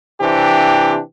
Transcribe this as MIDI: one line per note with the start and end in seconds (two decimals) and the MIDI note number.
0.21 0.99 48
0.21 0.99 52
0.21 0.99 60
0.21 0.99 62
0.21 0.99 67